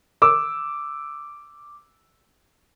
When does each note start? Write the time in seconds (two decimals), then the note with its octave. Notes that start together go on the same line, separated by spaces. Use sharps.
0.22 D6 E6